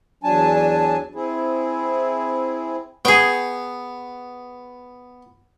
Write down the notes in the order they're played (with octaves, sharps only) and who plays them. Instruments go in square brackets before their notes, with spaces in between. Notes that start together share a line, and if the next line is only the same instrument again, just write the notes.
[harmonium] E2 F#3 D4 G#5 A5
C4 E4 G#4
[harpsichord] B3 C#6 [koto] G#4 G5